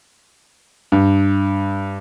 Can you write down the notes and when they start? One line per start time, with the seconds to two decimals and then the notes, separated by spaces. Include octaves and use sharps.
0.92 G2